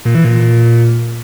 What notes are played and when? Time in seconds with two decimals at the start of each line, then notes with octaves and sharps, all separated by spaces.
0.05 A#2
0.15 E3
0.24 A#2